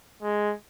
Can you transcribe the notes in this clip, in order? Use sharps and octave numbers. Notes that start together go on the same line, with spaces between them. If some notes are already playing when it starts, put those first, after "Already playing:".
G#3